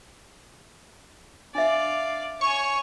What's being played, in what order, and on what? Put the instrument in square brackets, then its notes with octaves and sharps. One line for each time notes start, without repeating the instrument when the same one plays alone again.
[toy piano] D4 E5 [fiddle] D5 F5
[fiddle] C#5 G#5 [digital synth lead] C#6